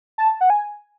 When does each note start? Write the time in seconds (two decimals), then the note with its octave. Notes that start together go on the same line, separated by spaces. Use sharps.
0.18 A5
0.41 F#5
0.50 G#5